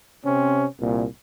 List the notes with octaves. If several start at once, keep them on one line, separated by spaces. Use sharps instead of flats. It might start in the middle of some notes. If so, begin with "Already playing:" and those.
C3 C4 C#4
C2 A#2